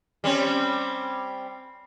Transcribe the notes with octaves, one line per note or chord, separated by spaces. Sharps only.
G3 C4 C#4